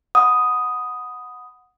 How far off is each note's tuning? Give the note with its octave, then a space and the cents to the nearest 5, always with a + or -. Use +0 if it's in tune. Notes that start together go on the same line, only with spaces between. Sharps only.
F#5 -15 B5 +25 D#6 +0